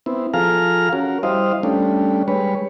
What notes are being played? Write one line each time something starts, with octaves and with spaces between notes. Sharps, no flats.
B3 C4 E4
F3 G#4 A4 F5 A#5 F6
C#4 F#4 A#4
G3 E4 C5 D#5 F5
G3 A3 C#4 D4
G3 G#3 B4 C#5